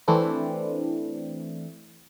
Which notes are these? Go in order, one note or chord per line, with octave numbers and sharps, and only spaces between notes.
E3 A3 C4 D4 E4